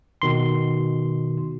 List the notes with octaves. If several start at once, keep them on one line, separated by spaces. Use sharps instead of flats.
B2 D#3 C6